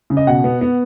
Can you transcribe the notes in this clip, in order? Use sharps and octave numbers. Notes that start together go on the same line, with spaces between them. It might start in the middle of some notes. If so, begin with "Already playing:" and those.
C#3
D#5
B2 F#5
B3
B3